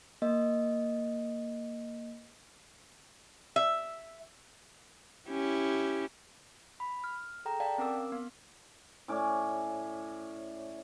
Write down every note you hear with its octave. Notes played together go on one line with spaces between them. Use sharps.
A#3 D#5
E5
C#4 E4 G4
B5
F6
G#4 A4 G5 A#5
D5 F5 G5 A5
C4 C#4 A#4 D6 E6
B3 F5
A2 C#4 D5 D6